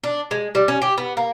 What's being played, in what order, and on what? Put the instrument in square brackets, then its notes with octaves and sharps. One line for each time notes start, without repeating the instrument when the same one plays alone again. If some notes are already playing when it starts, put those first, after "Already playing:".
[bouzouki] D4
G#3
G3
C#4
G4
B3
A#3